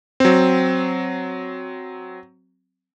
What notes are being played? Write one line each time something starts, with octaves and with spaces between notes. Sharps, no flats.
F#3 C4